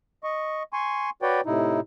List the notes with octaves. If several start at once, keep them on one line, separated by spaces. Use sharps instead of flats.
D#5 C#6
G#5 C6 C#6
F#4 B4 C#5 D5 G5
A2 C3 D#4 E4